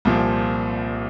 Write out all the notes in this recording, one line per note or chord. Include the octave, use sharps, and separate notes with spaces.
C2 A#2 F3 C4